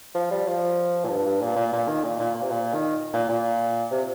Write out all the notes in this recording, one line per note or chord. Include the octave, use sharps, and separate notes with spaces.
F3
G3
F3
A#2
G2
G2
A#2
A#2
A#2
D#3
A#2
A#2
A#2
C3
A#2
D#3
A#2
A#2
C3